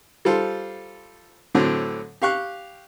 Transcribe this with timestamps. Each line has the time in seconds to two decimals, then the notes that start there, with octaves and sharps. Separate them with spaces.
0.25 G3 F4 A4 C5
1.55 A2 D3 F#3 C4
2.22 G4 F5 C#6 F#6